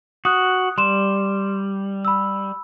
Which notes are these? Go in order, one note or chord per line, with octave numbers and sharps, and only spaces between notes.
F#4 D#6 F#6
G3 C6 E7
B5 E6